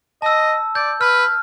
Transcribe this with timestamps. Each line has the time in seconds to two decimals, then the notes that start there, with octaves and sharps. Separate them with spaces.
0.22 D#5 A5 E6
0.75 D5 G6
1.01 B4 F6